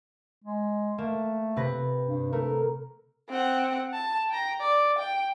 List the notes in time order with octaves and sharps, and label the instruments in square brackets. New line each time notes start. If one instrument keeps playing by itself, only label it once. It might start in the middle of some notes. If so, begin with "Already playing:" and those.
[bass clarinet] G#3
[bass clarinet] A3 [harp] A#3 E7
[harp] C3 B4 A#6
[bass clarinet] G2
[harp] A3 [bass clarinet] A#4
[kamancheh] C4 F#5
A5
G5 A#5
D5
G5